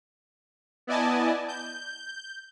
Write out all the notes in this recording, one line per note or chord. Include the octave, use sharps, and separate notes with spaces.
B3 E4 D5 D#5 G#5 A5
G6